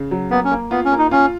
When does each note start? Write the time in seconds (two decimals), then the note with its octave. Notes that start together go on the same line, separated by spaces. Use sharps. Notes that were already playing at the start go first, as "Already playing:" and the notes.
Already playing: C#3
0.11 F#3
0.31 A#3 B3
0.45 C#4
0.51 A#3
0.71 B3 F4
0.85 C#4
0.92 A#3
0.98 D#4
1.11 C#4 F4